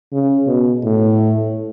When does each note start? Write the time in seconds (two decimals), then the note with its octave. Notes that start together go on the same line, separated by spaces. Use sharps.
0.12 C#3
0.47 B2
0.83 A2